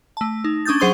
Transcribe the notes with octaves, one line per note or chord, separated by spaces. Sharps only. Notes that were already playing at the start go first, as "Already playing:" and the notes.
A3 A5
D#4
C#4 D4 D#6 G6 A6
F#3 G#4 C5 C6 D#6 G7